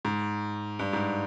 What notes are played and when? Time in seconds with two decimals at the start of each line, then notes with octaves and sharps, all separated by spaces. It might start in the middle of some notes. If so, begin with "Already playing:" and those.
0.05 G#2
0.79 G2
0.93 G#2